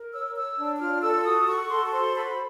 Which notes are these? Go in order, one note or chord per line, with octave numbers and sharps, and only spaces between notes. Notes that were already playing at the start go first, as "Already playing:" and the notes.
Already playing: A#4
C#5 E6
C#5 E6
D4
E6
F4 F6
A4 E6
F#4 D#6
F#4 C#6
A4 C6
C#6
C5 C6
F#4 B5